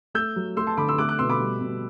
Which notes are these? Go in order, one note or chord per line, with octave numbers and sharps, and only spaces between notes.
A3 E6 G6
F#3
A3 C6 E6
A5 C6
D3 B5 D6
C6 E6
A3 D6 F#6
D6 F#6
B2 C6 E6
B5 D6
G3
B2